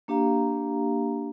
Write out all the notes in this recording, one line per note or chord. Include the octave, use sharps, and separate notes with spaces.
A#3 D4 G4 F5 A#5